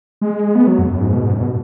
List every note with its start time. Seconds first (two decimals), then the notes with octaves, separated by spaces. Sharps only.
0.21 G#3
0.55 B3
0.67 F#3
0.79 F#2
0.90 F#2
1.01 G#2
1.13 B2
1.24 G#2
1.32 F#2
1.41 B2